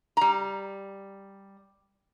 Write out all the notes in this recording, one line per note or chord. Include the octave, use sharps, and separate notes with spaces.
G3 A#5